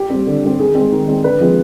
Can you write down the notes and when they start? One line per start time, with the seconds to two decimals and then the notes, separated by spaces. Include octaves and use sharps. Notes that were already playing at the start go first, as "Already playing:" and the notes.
Already playing: G4
0.10 G3 C4
0.26 D3
0.43 G3 C4
0.59 D#3 G#4
0.75 G#3 C4
0.92 D#3
1.08 G#3 C4
1.24 D3 B4
1.40 F3 G#3 C4